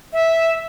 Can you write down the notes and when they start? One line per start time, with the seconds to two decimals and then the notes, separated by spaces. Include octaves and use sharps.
0.13 E5